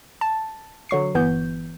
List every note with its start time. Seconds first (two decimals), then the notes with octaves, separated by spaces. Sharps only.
0.21 A5
0.89 D3 F#3 C#6 C7
1.15 G1 E3 B3 G6